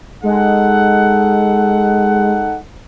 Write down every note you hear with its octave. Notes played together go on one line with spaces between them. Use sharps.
G#3 D#4 A4 F#5